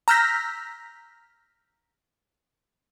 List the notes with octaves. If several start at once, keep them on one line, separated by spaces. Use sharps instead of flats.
A#5 E6 F6 G6 A#6 B6